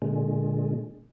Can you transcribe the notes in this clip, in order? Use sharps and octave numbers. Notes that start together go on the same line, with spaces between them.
A#2 D3 G#3